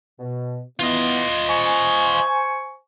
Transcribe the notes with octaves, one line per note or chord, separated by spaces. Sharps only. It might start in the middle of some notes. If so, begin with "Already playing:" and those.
B2
E3 B3 F4 D#5
C5 G#5 C#6